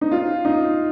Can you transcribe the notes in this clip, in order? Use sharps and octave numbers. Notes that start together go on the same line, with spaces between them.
D#4
F4
D#4